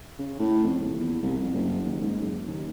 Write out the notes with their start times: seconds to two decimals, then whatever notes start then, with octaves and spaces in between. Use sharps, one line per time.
0.19 C#3
0.39 A2
0.64 F2
0.80 D#1
0.99 E2
1.23 C2
1.41 F2
1.54 F#1
1.86 D#2
2.01 G#2
2.20 F#1
2.47 D#2